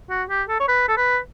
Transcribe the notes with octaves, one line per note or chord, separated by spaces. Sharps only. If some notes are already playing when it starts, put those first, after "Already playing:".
F#4
G4
A4
C#5
B4
A4
B4